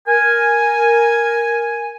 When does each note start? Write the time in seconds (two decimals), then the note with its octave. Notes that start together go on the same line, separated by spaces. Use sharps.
0.07 A#4 G#5